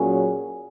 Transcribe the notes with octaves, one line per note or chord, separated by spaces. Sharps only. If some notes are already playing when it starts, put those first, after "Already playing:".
Already playing: A#2 F#3 C#4 G#4